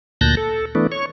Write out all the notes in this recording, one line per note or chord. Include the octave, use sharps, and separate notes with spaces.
D2 A#2 A5 F#6 G6 A#6
A4
E3 A3 B3 D4
C#5 C#6